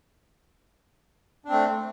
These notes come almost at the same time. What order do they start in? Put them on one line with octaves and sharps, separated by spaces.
D4 C4 A3